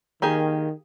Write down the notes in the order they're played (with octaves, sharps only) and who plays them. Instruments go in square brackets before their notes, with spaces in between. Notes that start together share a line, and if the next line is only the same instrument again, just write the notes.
[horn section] D#3 [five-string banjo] A#3 G4 G#4